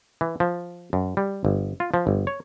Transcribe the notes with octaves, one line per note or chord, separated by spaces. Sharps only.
E3
F3
F#2
G3
G1
F4
F3
G1
C#5